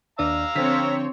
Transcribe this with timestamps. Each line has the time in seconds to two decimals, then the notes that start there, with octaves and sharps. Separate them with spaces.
0.19 D#2 D4 D5 F5 A#5 E6
0.56 D3 F3 C4 C#5 B6